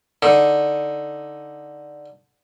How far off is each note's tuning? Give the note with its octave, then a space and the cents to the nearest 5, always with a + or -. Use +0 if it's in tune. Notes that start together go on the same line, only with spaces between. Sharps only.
D3 +0 D#4 +5